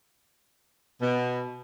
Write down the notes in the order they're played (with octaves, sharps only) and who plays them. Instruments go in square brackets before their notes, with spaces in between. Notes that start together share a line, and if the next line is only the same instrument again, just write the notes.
[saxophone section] B2